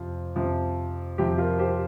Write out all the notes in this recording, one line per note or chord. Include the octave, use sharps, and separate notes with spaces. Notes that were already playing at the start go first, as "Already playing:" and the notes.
Already playing: F2 C3 F3 F4
F2 C3 F3
F2 C3 F3 G4
F4 A#4
G4 C5